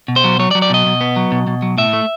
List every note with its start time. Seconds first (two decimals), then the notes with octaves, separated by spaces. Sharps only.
0.08 B2
0.16 C5
0.24 F#3
0.39 F#3 C#5
0.51 D5
0.55 F#3
0.62 D5
0.70 B2 D#5
0.86 B2
1.01 B3
1.16 F#3
1.32 B2
1.47 B2
1.62 F#3
1.78 A2 E5
1.93 A3